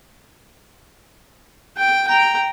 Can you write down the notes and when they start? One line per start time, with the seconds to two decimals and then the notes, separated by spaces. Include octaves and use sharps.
1.77 G5
2.07 G5 A#5